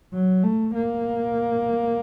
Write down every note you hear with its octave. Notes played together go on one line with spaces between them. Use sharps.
F#3
A3
A#3